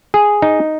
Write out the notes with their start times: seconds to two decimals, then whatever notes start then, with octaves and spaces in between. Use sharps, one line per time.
0.14 G#4
0.42 D#4